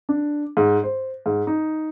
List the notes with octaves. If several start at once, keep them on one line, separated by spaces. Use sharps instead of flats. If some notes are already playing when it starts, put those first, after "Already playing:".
D4
G#2
C5
G#2
D#4